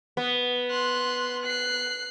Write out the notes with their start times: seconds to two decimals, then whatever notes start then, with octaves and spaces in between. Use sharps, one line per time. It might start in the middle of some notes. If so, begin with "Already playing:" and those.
0.17 B3
0.71 C6 F#6
1.43 F#6 C7